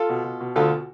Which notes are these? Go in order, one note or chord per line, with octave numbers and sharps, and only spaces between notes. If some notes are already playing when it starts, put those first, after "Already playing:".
Already playing: F4 A4
B2
B2
B2
D2 F4 A4